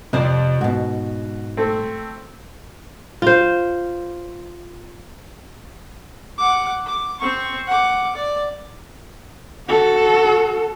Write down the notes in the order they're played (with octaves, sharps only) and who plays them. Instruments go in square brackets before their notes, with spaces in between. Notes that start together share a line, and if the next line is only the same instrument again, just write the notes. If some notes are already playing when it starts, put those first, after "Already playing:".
[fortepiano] F2 [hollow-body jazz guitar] C3 C5 D5
[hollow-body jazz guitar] G#2 B2 [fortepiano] F#4
[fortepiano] A3 C4
[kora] F4 C5
[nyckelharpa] F#5 D6
D6
C4 C#6
F#5 D6
D5
[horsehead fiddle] F#4 A4